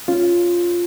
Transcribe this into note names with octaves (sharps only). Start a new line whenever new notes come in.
C#4 F4